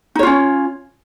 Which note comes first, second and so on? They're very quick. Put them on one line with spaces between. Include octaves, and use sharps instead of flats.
D#4 C#5 F4 C#4